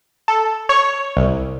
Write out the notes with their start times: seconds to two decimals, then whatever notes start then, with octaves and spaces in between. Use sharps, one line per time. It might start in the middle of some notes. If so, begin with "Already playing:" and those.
0.28 A4
0.69 C#5
1.17 C2